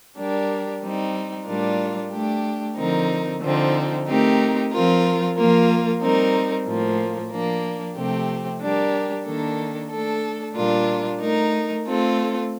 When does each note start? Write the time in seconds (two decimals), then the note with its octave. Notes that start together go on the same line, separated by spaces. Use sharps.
0.17 G3 D4 G4 A#4
0.82 G3 C4 D#4
1.47 A2 G3 D4 F4 A#4
2.12 A3 D4 G4
2.77 D3 F3 C4 D#4 A#4
3.41 D3 F3 C4 D#4
4.07 A3 C4 D#4 G4 A#4
4.72 F3 C4 F4 A#4
5.36 F3 A#3 F4 A#4
6.01 G3 C4 D#4 A#4
6.66 A2 F3 A#3
7.31 F3 A#3 D4
7.95 C3 F3 A3 C4 G4
8.61 G3 D4 G4 A#4
9.25 D#3 A#3 D4 A4
9.91 A3 D4 A4
10.55 A#2 G3 D4 F4 A#4
11.20 A3 D#4 A#4
11.85 A3 C4 F4 A4